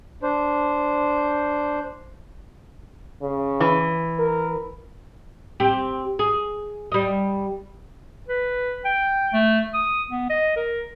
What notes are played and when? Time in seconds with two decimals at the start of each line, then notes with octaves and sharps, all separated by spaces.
0.22 D4 C5
3.22 C#3
3.60 E3
4.19 A#4
5.60 C4 G4
6.19 G#4
6.92 G3 D#5
8.28 B4
8.85 G5
9.33 A3
9.74 D#6
10.10 B3
10.30 D#5
10.56 A#4